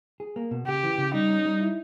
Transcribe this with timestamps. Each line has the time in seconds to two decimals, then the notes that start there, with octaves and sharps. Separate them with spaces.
0.20 G#4
0.36 A#3
0.51 B2
0.67 C#3 G4
0.83 E3
0.98 C#3
1.14 G3 D#4
1.29 C#4
1.46 G3
1.61 E4